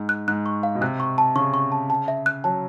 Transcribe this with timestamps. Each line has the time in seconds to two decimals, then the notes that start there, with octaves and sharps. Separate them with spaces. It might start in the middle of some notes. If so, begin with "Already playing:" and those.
Already playing: G#2
0.09 F#6
0.28 G#2 F#6
0.46 C#6
0.63 F5
0.75 B2
0.81 C3 F#6
1.00 C#6
1.18 A5
1.35 C#3 C#6
1.54 C#6
1.72 A5
1.90 A5
2.08 E5
2.26 F#6
2.44 F#3 A5